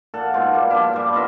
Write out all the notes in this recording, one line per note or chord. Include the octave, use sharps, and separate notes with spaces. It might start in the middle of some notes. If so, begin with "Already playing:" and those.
A#2 A4 F#5
G#2 B2 F4
A#2 G3
F3 D4 E4
G2 G3
B3 F4 D#5 E5